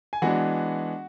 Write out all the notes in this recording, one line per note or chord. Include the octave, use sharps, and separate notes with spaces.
G#5
E3 G#3 B3 D4 F#4 F#5